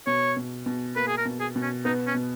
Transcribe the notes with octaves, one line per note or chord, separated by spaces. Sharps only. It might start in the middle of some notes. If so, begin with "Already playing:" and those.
B2 C#5
B2
B2
A#3 B4
G#4
A#4
B2
G#4
B2
C#4
B3 D#4
C#4
B2